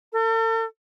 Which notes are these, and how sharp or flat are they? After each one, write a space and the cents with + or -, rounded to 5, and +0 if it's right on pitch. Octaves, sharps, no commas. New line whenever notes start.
A4 +45